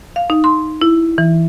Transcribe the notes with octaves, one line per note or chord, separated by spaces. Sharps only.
F5
D#4
C6
E4
E3